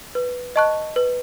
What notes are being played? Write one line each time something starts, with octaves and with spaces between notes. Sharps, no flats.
B4
D#5 A5 C#6 F#6
B4